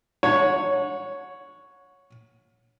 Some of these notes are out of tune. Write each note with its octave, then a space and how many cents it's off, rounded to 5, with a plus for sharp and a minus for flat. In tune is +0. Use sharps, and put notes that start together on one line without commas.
C#5 +0 F#5 -25